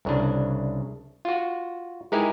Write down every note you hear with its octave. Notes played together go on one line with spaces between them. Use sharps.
C2 C#3 D4
F4 F#4
G#3 D#4 E4 G4 G#4 A#4